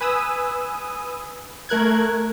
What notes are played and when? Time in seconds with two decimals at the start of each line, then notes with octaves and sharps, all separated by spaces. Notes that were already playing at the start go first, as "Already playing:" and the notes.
0.01 B4 G#5 D#6 E6
1.69 A3 A#4 F#6 G#6